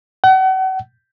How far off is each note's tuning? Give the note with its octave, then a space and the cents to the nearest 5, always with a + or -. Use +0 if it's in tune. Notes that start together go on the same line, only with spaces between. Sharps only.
F#5 +40